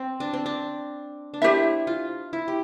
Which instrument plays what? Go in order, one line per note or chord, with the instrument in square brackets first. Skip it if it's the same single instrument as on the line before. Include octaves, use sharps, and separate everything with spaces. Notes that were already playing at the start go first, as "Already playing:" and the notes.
Already playing: [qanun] C4
D4
C4
D4
D4
[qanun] E4 [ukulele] G4 C5 E5
[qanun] F4
E4
G4